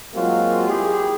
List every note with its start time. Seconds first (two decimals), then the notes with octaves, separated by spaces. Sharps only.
0.14 F#3 G#3 A#3 C4 F4 F#4
0.68 E4 G4 G#4